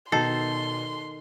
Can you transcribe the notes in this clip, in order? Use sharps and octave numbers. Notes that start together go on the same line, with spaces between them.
B2 D#3 A4 C6 C7